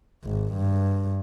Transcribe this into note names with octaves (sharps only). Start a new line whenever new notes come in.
G#1
G2